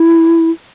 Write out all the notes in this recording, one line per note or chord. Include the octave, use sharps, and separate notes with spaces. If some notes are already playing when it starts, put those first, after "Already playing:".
Already playing: E4